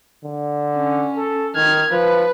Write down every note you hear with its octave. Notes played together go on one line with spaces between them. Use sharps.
D3
C#4
A4
D#3 F6 G#6
F3 B4